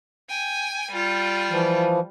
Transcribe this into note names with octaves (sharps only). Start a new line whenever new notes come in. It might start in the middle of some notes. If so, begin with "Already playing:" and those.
G5 G#5
G3 F4
E3 F3